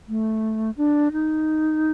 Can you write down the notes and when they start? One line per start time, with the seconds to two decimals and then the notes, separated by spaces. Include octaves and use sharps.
0.08 A3
0.77 D4
1.12 D#4